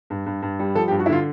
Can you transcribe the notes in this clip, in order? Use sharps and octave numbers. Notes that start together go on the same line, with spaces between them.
G2
G2
G2
G3
F3 A4
G4
G2
F#4
E4
D3 F4